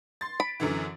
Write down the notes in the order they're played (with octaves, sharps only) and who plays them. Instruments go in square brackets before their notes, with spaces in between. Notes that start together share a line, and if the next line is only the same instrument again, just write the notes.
[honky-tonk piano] C6 A6
[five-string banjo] B5 [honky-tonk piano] D7
[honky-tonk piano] F#2 D3 E3